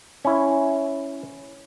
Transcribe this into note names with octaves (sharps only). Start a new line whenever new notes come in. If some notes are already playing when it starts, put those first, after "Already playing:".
C#4 E4